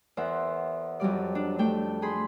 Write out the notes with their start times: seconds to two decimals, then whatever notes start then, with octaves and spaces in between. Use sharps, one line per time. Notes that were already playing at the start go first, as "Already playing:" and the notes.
0.17 E2 A#4 C5 E5 F#5
1.00 F2 F#3 G3 D5
1.35 D4
1.59 A3 D4 G5
2.02 G#4 B5 C6